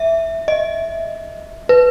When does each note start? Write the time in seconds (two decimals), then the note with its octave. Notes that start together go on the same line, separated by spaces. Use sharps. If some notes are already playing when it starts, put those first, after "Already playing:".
Already playing: E5
0.48 D#5
1.69 B4